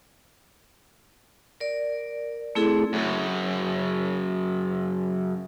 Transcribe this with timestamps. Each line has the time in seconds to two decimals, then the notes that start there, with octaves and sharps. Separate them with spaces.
1.60 A#4 D5
2.55 A3 C4 E4 G#4 A4
2.93 F#2 C#3